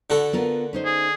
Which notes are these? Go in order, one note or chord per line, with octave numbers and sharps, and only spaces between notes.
D3 F#4 A4
B3 F4 A#4
C#4 D#4 C5
G#4